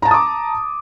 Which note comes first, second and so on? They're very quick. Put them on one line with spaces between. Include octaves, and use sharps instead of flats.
A#5 A5 A6 D#6 D6